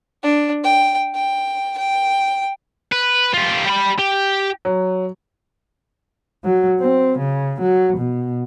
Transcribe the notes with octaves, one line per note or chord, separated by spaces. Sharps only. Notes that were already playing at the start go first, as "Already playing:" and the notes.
D4
G5
G5
G5
B4
F4 G4
G3 B5
G4
F#3
F#3
C4
C#3
F#3
B2